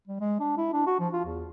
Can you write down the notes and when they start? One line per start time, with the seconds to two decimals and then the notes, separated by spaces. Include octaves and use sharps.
0.07 G3
0.21 G#3
0.40 D4
0.57 E4
0.73 D4
0.87 F#4
1.00 F3
1.13 F4
1.25 E2